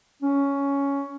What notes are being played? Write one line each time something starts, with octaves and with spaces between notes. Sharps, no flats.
C#4